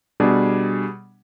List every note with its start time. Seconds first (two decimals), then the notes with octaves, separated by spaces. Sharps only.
0.20 B2 G3 D4 G#4